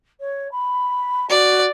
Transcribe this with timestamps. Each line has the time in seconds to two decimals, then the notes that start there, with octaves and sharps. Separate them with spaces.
0.20 C#5
0.52 B5
1.30 F#4 D5